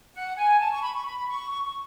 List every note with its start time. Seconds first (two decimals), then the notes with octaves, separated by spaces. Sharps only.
0.14 F#5
0.37 G#5
0.59 A5
0.71 C#6
0.82 B5
0.94 C#6
1.05 B5
1.28 C#6
1.50 C#6
1.66 C#6